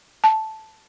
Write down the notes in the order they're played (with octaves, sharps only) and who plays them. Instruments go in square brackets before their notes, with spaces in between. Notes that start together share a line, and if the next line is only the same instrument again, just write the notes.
[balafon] A5